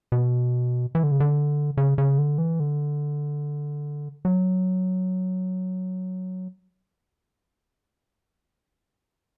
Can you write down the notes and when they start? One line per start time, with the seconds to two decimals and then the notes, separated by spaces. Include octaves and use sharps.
0.12 B2
0.95 E3
1.03 D3
1.11 C#3
1.20 D3
1.77 C#3
1.98 C#3
2.18 D3
2.38 E3
2.60 D3
4.25 F#3